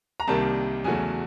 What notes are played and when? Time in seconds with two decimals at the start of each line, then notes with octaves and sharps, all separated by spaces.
0.20 A#5
0.27 C2 C3 D#3 G3 A#3 A5
0.84 E2 C#3 F#3 A3 G#5